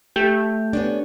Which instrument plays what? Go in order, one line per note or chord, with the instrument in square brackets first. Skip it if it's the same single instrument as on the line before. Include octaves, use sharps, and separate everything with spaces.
[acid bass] A3 [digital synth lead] G4
[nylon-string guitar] B3 C#4 D4